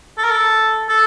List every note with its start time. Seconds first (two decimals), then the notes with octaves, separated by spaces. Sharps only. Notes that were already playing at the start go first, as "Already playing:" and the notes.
0.18 A4
0.24 A#4
0.31 A4
0.88 A4